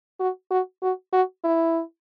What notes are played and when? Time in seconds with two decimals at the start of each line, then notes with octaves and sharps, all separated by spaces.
0.20 F#4
0.51 F#4
0.83 F#4
1.13 F#4
1.44 E4